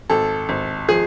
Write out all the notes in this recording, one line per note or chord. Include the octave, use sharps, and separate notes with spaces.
G#1 A4
G#1
F3 G#4